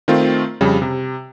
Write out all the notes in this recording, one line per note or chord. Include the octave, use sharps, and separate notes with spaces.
D#3 A3 C4 F4
F2 C#3 G3
C3